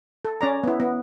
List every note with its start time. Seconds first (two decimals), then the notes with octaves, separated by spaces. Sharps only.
0.25 A4
0.41 C#4 D5 A#5
0.64 B3 E4
0.80 B3